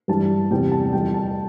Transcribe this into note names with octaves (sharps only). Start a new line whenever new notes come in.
G2 E3 G3 A5
E2 C3 G3 G5
A5
F2 E3 G3 G5
A5